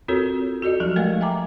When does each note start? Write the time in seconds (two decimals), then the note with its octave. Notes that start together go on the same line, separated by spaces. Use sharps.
0.08 C4 F4 F#4 A4 A#4 C#5
0.62 F#4 A4 D5 D#5
0.80 F3 F#3 D#4 G4
0.96 G#3 A3 A#4 D#5 F5
1.21 E5 G5 G#5 A#5 D6